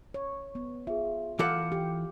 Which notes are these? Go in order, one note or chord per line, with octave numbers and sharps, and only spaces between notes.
C#5
B3
F4 G#4 E5
E3 F4 A4 F5 F#5 D6 G6 C#7
G4